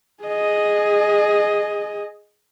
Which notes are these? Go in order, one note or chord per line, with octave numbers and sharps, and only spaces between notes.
G#4 D#5